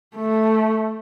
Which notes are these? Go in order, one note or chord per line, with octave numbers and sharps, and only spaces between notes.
A3